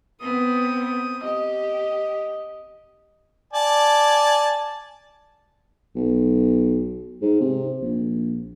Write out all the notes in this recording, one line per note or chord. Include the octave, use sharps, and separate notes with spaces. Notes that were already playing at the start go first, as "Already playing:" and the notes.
B3 C4 D#6
G4 D#5
D5 G#5 A5
B1
G#2
C3
A#1